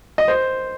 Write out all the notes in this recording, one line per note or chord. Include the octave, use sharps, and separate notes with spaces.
D#5
C5